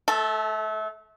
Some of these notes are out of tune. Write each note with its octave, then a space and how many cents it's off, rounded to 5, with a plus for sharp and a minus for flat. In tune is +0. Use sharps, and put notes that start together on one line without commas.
A3 -30 A4 +0